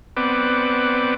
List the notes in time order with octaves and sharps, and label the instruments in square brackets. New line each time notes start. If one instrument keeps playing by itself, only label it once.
[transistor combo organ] B3 C4 B4 D5 F#5 D6